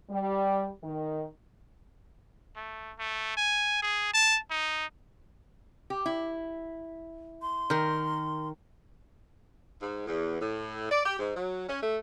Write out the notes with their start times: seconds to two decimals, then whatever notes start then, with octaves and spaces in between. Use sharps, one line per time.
0.10 G3
0.83 D#3
2.56 A3
2.98 A3
3.37 G#5
3.82 G#4
4.14 A5
4.50 D#4
5.90 G4
6.06 E4
7.42 C6
7.70 D#3 A#4
9.81 G#2
10.07 E2
10.41 A2
10.91 D5
11.05 G4
11.20 G#2
11.37 F#3
11.69 C#4
11.82 A3